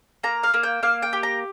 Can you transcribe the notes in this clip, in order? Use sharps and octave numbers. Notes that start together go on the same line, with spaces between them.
A#3 A#5
F5
A#3
G5
A#3 F5
G5
G4
A#5